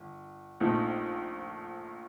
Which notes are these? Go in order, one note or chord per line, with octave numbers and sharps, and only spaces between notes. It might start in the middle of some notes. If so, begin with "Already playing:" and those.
Already playing: G1
A#1 A#2 A3 C4 D#4